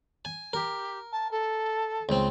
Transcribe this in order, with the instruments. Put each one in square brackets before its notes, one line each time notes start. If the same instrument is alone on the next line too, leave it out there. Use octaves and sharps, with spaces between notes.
[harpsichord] G#5
[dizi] G4 [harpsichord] A#4
[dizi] A5
A4
[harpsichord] C#2 C4